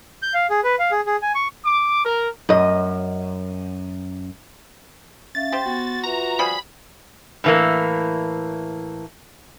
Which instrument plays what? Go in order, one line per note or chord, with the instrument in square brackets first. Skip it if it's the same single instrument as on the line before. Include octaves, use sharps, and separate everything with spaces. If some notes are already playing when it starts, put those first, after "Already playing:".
[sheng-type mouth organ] G6
F5
G#4
B4
F5
G#4
G#4
G#5
C#6
[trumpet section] D6
A#4
[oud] F#2 D#5
[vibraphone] C#4 E5 F5 [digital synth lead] A6
[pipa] G4 C5 [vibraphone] G5
[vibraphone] B3 [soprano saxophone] F#4
[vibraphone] F4 B4 E5 [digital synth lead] A#5
[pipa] F3 G3 G#4 [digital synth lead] B5
[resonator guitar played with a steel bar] A2 E3 A#3